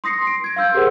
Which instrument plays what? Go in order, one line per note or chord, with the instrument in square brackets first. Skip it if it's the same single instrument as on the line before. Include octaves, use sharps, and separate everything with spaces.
[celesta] C6 D#6 A#6 C7 C#7
D7
G#6 D7
F5 C6 E6 G6
G4 G#4 A#4 C5 F#5